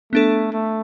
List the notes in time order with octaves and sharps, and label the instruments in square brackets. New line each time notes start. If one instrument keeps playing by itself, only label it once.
[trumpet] A3 [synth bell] B3 D4 A4
[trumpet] A3